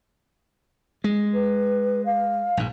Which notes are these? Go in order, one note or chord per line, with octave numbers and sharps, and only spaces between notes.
G#3
B4
F5
A#1 G#2